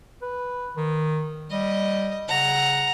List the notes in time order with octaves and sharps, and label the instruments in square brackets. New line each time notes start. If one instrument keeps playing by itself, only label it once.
[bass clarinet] B4
D#3
[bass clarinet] G3 [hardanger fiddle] D#5
[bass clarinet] C#3 [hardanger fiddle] F#5 A#5